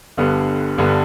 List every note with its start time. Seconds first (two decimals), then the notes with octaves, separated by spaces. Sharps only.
0.17 G1 G2 D3 G3 B3
0.78 G1 G2 D3 G3 B3